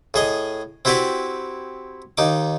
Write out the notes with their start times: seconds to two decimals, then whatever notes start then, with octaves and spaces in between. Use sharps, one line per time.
0.14 A2 G#4 D#5
0.85 C4 E4 F#4 G4 B4 D5
2.18 D#2 D#4 D6